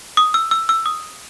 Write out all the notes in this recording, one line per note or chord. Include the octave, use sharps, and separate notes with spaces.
D#6
E6
E6
E6
D#6